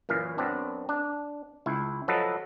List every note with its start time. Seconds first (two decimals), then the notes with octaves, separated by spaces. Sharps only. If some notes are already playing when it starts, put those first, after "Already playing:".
0.09 F#2 A#2 E3 F5
0.38 F#2 B3 C4 D4
0.89 D4
1.66 C#2 E4
2.08 F3 F#3 A4 B4 D#5